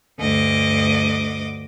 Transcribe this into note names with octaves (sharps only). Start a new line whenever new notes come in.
D2 G2 D#5 D6